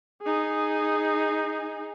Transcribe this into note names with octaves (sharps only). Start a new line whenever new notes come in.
D#4 G#4